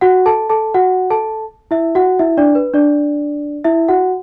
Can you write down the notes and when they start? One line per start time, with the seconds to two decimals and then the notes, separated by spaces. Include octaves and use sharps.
0.01 F#4 F#5
0.26 A4 A5
0.50 A4 A5
0.74 F#4 F#5
1.10 A4 A5
1.71 E4 E5
1.95 F#4 F#5
2.19 E4 E5
2.37 D4 D5
2.55 B4
2.74 D4 D5
3.64 E4 E5
3.88 F#4 F#5